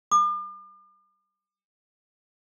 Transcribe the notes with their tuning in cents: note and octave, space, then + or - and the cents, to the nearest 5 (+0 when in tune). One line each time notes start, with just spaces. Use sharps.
D6 +45